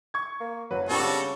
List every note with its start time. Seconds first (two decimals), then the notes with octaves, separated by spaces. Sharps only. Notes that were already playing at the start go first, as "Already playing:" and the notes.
0.14 C#6 G#6
0.40 A#3
0.71 F#1 F#3 B4
0.89 A#2 G3 C4 D4 F#4 A4
1.01 C#3